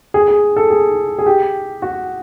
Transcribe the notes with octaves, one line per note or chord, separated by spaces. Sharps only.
G#4
G#4
A4
G#4
G#4
G4
F#4